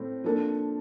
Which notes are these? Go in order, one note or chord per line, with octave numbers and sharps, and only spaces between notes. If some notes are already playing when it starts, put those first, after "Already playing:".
Already playing: A2 A3 C4
F3 A#3 D4 A4